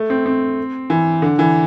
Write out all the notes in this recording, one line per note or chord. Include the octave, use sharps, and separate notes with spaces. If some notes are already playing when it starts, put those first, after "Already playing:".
Already playing: A3
C4
C4
E3
D3
E3